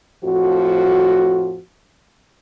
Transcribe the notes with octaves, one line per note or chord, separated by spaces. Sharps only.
F2 A2 F3 F#4